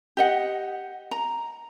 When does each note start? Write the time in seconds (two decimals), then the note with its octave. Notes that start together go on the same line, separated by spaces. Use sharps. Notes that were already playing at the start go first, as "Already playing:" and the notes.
0.17 G4 D#5 F#5
1.11 A#5